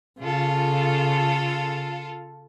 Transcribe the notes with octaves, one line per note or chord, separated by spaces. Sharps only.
C#3 F4 A4